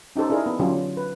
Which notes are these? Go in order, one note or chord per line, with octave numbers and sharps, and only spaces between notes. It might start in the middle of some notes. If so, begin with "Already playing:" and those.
C#4 D#4 G4 A4 C5
D4 E4 G#4 A#4
B3
D3 F#3 C#4 F4 G4
B4